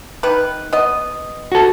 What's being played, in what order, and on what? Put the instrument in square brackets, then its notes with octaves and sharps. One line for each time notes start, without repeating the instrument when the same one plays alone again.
[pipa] D#3 B4
B3 D#5
[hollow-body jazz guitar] F#4 A4